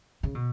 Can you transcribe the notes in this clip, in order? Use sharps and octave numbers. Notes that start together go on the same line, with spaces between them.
C#3
B2